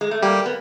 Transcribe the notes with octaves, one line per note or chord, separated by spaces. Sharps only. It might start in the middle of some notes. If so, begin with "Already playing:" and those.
G#3
A3
G3 A#3 G4
B3